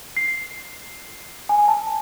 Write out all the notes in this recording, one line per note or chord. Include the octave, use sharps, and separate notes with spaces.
C7
G#5
A5